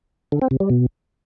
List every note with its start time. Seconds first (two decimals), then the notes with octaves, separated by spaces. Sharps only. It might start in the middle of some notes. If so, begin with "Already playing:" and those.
0.32 D3
0.42 C4
0.51 C3
0.60 G3
0.70 B2